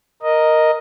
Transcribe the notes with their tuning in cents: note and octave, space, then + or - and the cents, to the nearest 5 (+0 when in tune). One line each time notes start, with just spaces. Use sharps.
A#4 +0 D#5 +0